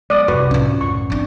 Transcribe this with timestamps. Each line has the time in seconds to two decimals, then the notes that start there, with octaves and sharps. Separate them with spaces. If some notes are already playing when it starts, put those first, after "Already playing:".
0.10 F#3 G#3 B3 D5 D#6
0.28 C2 F#2 F#4 B4 C#6
0.51 A2 C3 C#4 F4
0.81 B1 F#2 A2 C#6
1.10 C4 D4